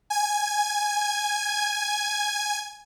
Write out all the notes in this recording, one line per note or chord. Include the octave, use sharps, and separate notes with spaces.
G#5 G#6